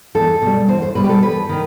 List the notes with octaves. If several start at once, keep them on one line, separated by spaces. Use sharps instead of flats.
E2 A4
B2 G3
E2 C5
C5
B2 G3 B4
G4
A4
E2 B4
D#3